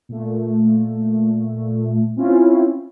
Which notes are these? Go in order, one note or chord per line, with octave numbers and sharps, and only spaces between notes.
A#2 A3
C4 C#4 E4 F4